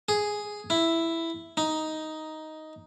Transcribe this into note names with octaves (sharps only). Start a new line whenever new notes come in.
G#4
E4
D#4